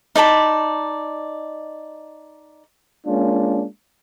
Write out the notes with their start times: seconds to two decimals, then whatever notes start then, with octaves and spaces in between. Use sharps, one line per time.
0.15 D#4 D5 A5 B5
3.06 G#3 A#3 C#4 D4 F4